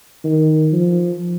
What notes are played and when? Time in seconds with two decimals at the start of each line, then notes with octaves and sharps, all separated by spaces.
0.24 D#3
0.72 F3